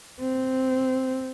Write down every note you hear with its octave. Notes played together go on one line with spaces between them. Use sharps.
C4